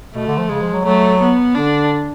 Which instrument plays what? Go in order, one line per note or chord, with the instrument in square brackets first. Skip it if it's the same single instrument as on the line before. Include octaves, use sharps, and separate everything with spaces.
[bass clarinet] B2 [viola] A3
[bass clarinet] D3
F3
[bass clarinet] C#3 [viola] G#3
[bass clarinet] F3
F#3
[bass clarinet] F#3 [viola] A3
[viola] B3
[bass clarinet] D3 [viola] D4